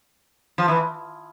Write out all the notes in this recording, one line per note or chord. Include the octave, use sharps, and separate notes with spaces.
F3
E3